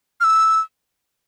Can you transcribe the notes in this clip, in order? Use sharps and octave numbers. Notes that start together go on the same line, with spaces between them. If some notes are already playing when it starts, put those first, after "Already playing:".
F6
E6